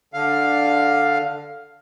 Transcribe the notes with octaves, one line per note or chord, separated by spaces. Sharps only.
D3 F5